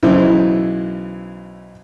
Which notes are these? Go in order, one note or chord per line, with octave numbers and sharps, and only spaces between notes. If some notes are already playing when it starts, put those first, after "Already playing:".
B1 C#3 E3 E4 C5